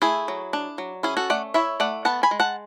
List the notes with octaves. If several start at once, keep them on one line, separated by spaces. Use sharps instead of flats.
A3 E4 G#4
F#3
D4
F#3
C#4 E4 G#4
F#4 A4
A3 D5 F#5
E4 C#5 E5
A3 D5 F#5
B3 F#5 A5
G#5 B5
G#3
F#5 A5